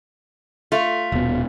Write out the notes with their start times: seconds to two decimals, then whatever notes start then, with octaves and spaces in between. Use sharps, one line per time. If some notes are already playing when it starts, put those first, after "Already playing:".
0.72 A3 F4
1.12 D#1 B2